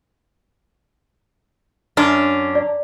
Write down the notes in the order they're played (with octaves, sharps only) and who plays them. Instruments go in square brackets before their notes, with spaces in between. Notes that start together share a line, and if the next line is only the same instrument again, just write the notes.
[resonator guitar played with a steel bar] F#2 C#4 D4
[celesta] D5